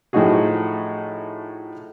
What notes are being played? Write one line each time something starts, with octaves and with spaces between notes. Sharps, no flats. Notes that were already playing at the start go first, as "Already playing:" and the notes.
A2 F3 A3 D#4 F#4 G#4